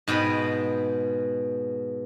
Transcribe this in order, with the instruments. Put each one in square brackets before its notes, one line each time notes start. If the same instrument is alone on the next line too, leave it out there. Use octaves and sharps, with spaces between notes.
[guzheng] G#2 B2 G5 B5